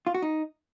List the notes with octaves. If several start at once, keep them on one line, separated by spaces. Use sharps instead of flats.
F4
F#4
D#4